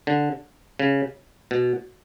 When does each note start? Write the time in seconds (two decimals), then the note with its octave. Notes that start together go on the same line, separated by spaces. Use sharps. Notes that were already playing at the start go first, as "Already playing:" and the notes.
0.07 D3
0.79 C#3
1.51 B2